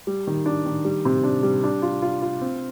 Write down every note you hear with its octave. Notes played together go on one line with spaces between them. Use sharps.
G3
D#3
D4
D#3
G3
C3
D4
G3
D4
F4
F4
F4
C4